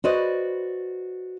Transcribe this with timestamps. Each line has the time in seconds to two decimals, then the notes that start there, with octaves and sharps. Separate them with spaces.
0.04 F#4 B4 C5 D5 D#5